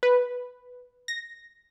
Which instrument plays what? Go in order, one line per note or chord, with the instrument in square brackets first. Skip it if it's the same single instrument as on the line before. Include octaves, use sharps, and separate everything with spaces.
[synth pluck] B4
A#6